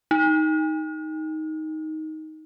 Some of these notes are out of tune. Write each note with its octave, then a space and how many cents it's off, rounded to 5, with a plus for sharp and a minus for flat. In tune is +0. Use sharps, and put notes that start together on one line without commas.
D#4 +10